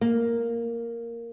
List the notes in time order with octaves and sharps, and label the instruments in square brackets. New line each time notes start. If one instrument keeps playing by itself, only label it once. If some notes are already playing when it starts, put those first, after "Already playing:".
[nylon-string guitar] A#3